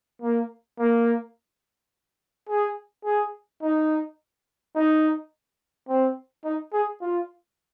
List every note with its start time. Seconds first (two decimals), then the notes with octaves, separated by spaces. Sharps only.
0.22 A#3
0.79 A#3
2.49 G#4
3.05 G#4
3.62 D#4
4.75 D#4
5.89 C4
6.44 D#4
6.73 G#4
7.01 F4